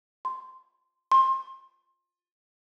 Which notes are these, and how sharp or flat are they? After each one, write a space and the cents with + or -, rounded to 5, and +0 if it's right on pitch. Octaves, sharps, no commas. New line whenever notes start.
C6 -5
C6 +25